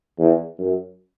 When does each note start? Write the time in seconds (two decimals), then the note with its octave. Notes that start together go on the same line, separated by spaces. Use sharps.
0.19 E2
0.59 F#2